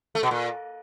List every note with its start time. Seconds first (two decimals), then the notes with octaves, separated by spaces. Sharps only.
0.15 A3
0.23 B2
0.31 A#2